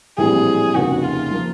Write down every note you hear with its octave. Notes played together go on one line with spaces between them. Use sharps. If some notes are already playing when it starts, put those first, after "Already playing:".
A#1 A2 E3 G3 C4 G#4
F1 D#2 C#3 F#4
F4
F3 A#3